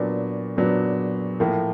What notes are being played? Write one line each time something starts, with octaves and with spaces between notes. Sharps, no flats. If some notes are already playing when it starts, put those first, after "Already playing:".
Already playing: A#2 F#3 B3 D4
A#2 F#3 B3 D4
A2 F3 A#3